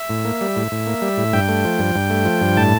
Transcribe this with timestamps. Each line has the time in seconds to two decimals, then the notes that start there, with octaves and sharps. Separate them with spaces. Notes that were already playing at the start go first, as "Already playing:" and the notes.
Already playing: E5
0.10 A2
0.25 A#3
0.41 G3
0.56 A2
0.72 A2
0.87 A#3
1.02 G3
1.17 A2
1.33 G2 G5
1.49 A3
1.64 F3
1.79 G2
1.95 G2
2.10 A3
2.25 F3
2.41 G2
2.57 A2 A5